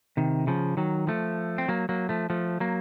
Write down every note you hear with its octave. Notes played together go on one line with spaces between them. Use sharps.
C3 D#3
C#3 F3
D#3 F#3
F3 A3
C4
F#3 A#3
F#3 A#3
F3 A3
F3 A3
F#3 A#3